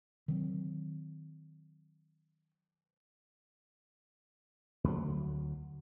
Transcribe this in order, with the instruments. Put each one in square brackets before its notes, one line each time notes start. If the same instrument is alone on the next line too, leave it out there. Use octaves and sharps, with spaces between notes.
[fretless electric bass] D#3 F#3 C4
[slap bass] D2 F#3